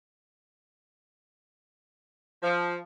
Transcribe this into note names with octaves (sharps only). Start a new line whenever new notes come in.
F3